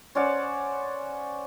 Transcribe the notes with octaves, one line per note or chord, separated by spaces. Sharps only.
C#4 C5 D5 F#5